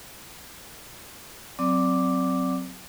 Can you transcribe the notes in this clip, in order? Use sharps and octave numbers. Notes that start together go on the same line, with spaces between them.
F#3 C4 D5 F#5 D6